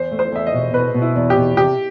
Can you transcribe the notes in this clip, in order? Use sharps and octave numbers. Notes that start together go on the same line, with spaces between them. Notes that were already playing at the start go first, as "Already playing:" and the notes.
Already playing: E2 C5
A3
C5
E2 E5
D#5
B2
B2 B4
B2
E4
E2
G4
B2
C3 G4